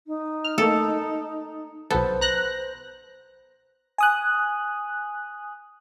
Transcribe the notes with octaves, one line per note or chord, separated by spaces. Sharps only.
D#4
F6
A3 A#3 A4
B1 B3 A4 C5
A#5 F#6 A#6
G#5 D#6 F#6